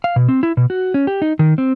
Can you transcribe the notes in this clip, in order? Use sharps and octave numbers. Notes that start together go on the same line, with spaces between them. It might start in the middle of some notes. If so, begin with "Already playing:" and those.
F5
B2
C4
E4
B2
F#4
C#4
G4
D#4
D#3
C4